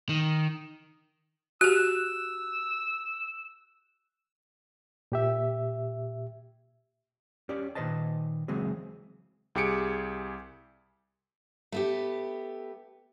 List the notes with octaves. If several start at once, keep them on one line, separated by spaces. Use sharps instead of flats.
D#3
F#4 G4 E6 F#6
A#2 G4 E5
C#4 G4 D5
A#2 D#3 B4 C5 D#5 A5
C#3 E3 F#3 G#3 C4 G#4
C2 G4 G#4 C#7 D7
A3 B3 G4